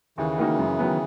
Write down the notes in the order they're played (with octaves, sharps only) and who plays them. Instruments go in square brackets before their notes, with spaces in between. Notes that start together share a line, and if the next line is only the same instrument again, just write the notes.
[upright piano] D#2 [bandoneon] C#3 E3
[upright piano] D#3 A#3 D#4 F#4
F#2
D#3 F#3 B3